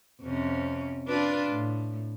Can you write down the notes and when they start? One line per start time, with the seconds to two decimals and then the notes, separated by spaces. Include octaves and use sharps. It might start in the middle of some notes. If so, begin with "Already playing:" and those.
0.22 F2 C3 C#4
1.07 D4 F4 B4
1.49 A2